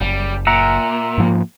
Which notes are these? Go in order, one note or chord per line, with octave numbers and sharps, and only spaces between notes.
F#1 G3
A#2 E5 F#5 A#5
G#2 F3 A#3